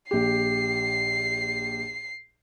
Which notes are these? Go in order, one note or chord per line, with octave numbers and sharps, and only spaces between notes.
A#1 G4 C7